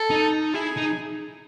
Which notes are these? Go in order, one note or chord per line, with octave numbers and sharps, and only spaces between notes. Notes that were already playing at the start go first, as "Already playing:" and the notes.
Already playing: A4
D#4
E4 G#4
D#4